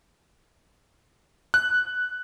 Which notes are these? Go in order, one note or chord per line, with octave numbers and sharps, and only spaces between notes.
F#6